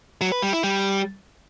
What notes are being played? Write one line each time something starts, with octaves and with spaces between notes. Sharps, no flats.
F#3
B4
G3
E4
G3